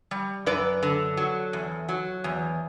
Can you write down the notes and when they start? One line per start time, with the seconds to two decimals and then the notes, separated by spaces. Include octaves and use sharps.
0.11 G3
0.46 F#2 B4 D5
0.83 D3
1.17 F#3
1.53 E2
1.89 F#3
2.24 E2